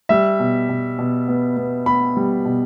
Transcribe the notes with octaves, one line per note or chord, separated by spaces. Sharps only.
G3 E5
B2
B2
B2
B3
B3
B3 B5
G3
B2